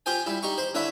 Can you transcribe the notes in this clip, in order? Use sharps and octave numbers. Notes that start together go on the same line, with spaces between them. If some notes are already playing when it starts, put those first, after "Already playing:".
F4 G4 C5 G5 G#5
G3 E4
G3 D#4 C#6
C5 C6
D3 E4 C#5 E5 B5